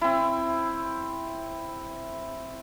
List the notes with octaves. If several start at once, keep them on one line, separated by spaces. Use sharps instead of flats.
C4 E4